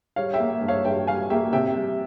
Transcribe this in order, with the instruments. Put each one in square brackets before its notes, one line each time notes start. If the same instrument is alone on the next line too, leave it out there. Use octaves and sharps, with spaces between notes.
[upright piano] G3 C#5 F5
E5 G5
A#3
G2
C#5 F5
G2 E5 G5
G3 F5 G#5
A#3 E5 G5
C3 E5 G5
G3